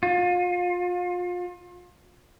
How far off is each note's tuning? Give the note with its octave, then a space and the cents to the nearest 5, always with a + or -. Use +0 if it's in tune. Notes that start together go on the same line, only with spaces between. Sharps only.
F4 +30